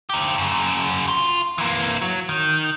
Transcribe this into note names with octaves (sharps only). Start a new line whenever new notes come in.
D#4 G4
F#2 C#3
F4
E3 A#3
F#3
D#3